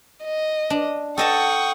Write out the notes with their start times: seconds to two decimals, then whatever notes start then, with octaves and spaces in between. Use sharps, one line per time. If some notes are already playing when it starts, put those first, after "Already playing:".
0.24 D#5
0.70 D4
1.18 A4 D#5 F#5 G5 A5 C#6 D#6